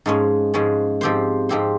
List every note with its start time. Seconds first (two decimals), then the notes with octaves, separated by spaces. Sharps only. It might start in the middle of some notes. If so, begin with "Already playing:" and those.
0.06 G#2 F3 G#3 C#4
0.54 G#2 F3 G#3 C#4
1.01 G#2 F3 C4 G4 C5
1.49 G#2 F3 C4 G4 C5